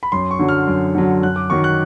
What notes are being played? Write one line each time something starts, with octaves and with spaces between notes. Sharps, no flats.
B5
F#2 C6
C#6
D3 F#3
F6
F#2
D3 F#3
F#2 F#6
D6
D#3 F#3 C#6
F#6